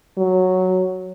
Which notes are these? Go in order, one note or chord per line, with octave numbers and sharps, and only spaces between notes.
F#3